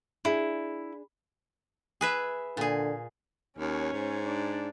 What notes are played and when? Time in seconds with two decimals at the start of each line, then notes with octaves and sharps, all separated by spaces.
0.25 D4 E4 G#4
2.01 G#4 B4 E5
2.57 A#2 D3 G#4
3.58 D#2 C#4 C#5
3.93 G#2
4.25 D4